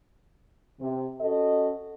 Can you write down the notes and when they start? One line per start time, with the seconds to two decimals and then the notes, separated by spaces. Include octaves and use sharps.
0.80 C3
1.20 C#4 F#4 A4 D#5